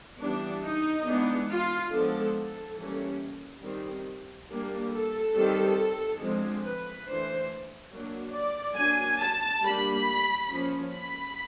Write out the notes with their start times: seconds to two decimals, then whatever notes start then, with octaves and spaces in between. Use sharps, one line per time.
0.21 E3 G3 B3 D4
0.64 D#4
1.06 E3 G#3 B3 D4
1.49 F4
1.92 F3 G#3 B3 D4 A4
2.35 A4
2.78 E3 G3 A#3 C#4
3.63 D#3 G3 C4
4.50 G3 A#3 D4
4.93 A4
5.35 D#3 G3 C4
6.21 D3 F3 G#3 C4
6.63 B4
7.07 E3 A3 D4 C5
7.93 F#3 A#3 D4
8.35 D5
8.78 F#3 A#3 D4 G#5
9.21 A5
9.63 G3 A#3 D4 B5
10.49 F3 A#3 C#4
10.92 B5